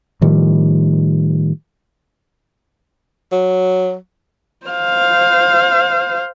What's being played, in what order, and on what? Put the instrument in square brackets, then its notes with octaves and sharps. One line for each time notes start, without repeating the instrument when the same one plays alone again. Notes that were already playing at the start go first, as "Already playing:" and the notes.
[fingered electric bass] A2 D#3 F3 G3
[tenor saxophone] F#3
[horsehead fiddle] C5 F5